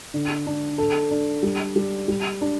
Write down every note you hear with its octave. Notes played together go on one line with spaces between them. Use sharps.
D3
D4
A4
D4
G3
G3
G3
D4